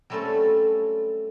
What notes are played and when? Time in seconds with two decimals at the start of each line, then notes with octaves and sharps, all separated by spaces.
0.10 F#3 G3 A3 C4 C#4 A4